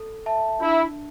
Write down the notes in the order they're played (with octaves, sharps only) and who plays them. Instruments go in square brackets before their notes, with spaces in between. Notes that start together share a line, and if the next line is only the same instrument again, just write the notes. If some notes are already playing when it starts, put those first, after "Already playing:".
Already playing: [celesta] A4
E5 A5
[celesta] D4 [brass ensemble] E4